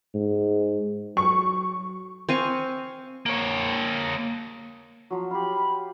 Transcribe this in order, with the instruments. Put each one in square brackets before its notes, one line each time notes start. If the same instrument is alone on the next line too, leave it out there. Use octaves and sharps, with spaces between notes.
[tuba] G#2
[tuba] F#3 [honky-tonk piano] C#6
[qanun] C4 F5 G#5 C#6
[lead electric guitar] A#3 C#5
[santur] F3 F#3
[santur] F4 G4 [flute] B5